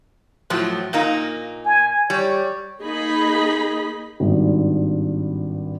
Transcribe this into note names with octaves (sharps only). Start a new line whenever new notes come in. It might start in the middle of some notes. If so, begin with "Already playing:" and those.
A2 F3 F#3
A#2 A#3 D#4
G#5
G3 C#5
A#3 D#4 G#4 D#5 B5
G#1 G2